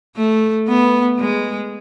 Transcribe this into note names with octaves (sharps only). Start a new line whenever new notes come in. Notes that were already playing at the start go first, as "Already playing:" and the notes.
A3
B3
G#3